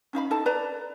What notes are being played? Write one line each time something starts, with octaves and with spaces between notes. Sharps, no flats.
C#4 D#4 F5 B5
D#4 A4 A5
B4 D5 A#5